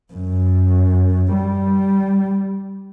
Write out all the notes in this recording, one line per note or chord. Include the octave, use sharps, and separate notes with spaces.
F#2
G3